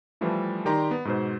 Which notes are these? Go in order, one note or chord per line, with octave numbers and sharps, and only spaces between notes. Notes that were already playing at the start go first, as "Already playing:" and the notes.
E3 F3 G3 A3 D4
D#3 G4 D5 A#5 C6
B3
G#2 B2 C5